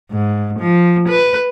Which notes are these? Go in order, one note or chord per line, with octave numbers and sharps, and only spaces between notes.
G#2
F3
B4